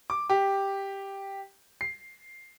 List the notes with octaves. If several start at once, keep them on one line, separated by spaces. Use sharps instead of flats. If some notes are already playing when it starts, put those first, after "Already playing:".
D6
G4
C7